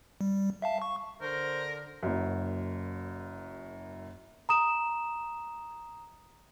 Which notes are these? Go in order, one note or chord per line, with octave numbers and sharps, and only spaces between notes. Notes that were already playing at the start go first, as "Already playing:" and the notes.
G3
E5 F5 A5
C#6
D3 A#4 C5
F#1 F#2
A#5 D#6 E7